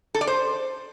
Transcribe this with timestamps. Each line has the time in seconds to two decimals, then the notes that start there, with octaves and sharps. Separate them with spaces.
0.15 A4
0.21 D5
0.27 C5